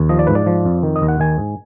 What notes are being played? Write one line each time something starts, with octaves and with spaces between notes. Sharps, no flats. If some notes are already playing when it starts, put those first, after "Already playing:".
Already playing: D#2
F3 D#5
D5
G#2 B4
D5
F3
F2
D#3
D#5
D#2
F#5
D#3 G#5
G#2